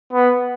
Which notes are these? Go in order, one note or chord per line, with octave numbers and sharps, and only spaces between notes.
B3